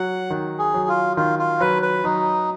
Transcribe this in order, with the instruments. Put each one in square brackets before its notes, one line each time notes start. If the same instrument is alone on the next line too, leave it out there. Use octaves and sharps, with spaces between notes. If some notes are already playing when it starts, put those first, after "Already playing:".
Already playing: [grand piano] F#3 [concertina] F#5
[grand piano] D#3
[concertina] G#4
[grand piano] F#3
[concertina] F4
[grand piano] D#3 [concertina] F4
[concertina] F4
[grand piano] F#3 [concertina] B4
[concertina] B4
[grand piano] F#3 [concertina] D#4